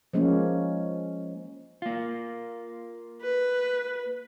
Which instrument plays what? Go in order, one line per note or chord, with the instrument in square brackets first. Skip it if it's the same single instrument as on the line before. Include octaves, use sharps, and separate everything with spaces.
[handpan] F3 G#3 A#3 C#4
[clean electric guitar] A#3 F4
[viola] B4